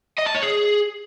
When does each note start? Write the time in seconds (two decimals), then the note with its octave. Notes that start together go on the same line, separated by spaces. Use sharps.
0.18 D#5
0.26 A5
0.34 C#5
0.43 G#4